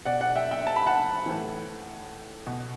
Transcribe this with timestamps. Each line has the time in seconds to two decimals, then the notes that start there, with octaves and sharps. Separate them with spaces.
0.05 B2 D5 F#5
0.21 D5 F#5
0.36 E5 G5
0.51 E5 G5
0.67 A5
0.76 B5
0.86 F#5 A5
1.26 A2 E3
2.47 B2